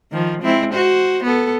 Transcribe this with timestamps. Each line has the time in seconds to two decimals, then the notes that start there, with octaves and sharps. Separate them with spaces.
0.11 D#3 F3
0.42 G#3 C4 E4
0.72 F#4 C5
1.24 B3 A4